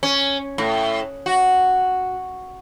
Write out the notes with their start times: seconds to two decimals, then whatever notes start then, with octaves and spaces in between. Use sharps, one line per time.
0.03 C#4
0.58 A2
1.26 F#4